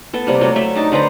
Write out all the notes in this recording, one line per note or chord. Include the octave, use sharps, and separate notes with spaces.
B3 A4
C3 G3 A#3
F#3 A3
A3 E5
D4 D#4 A5
D3 B4 C5 A#5